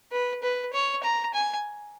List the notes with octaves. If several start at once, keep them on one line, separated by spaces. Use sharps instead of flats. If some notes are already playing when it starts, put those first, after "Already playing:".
B4
B4
C#5
A#5
G#5